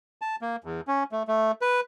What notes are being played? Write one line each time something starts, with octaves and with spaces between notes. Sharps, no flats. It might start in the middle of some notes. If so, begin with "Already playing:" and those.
A5
A#3
E2
C#4
A3
A3
B4